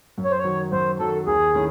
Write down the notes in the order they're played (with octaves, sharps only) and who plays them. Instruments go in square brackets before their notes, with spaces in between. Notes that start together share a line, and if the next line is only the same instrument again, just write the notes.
[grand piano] F#2
[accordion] C#5
C5
C#5
[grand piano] D#3 F#3
[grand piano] F#2 [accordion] C5
[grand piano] D#3 F#3 [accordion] A4
[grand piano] D#2 [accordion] G#4
[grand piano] D#3 A3 C#4 E4